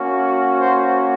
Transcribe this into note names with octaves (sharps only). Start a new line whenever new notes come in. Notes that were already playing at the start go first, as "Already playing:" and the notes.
Already playing: A#3 C#4 F#4
C5